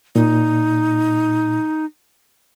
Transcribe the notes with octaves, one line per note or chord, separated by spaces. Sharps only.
A#2 D#4